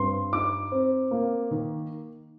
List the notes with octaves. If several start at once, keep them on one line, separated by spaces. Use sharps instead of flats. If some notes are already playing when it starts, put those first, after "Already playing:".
Already playing: G2 C4 C6
D#4 D6
C4
A#3
D#3